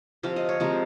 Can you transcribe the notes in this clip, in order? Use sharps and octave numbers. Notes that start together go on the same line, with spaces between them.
C3 F3 C4 F5
D#5
C#5
C3 F3 G#3 A#4